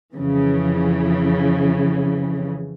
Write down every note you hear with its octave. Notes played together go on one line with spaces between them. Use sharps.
F2 C#3 E3